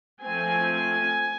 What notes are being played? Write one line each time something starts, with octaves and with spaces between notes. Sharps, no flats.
F3 A3 C4 G#5